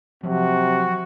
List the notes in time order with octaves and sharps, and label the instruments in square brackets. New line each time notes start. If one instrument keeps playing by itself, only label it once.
[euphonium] C3 [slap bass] F3 F#3 [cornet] F#4